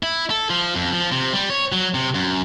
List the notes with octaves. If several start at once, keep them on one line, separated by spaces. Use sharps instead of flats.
E4
A4
F3
F2
F3
C3
G3
C#5
F#3
C3
F#2